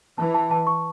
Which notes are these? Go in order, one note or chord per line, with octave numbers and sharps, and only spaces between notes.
E3 A5
A5
A5
C#6